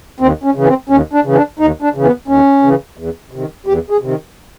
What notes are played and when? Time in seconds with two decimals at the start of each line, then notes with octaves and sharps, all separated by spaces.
0.20 D#2 C4
0.43 C#4
0.55 C#3 E3
0.67 C4
0.89 D#2 C#4
1.13 D4
1.24 C#3 E3
1.35 D4
1.59 D#2 D#4
1.82 D4
1.94 C#3 E3
2.04 B3
2.28 D#2 C#4
2.63 C#3 E3
2.97 E2
3.31 C3 D#3
3.66 E2 G4
3.90 G#4
4.01 C3 D#3